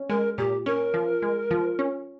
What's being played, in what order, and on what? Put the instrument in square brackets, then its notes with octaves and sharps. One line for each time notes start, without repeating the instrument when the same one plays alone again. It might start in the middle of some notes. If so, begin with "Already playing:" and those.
Already playing: [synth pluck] C#4
[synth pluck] G#3 [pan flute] A#4
[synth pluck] A#2 [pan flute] G4
[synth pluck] C#4 [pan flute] A#4
[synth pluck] F3
G#3
F3
C#4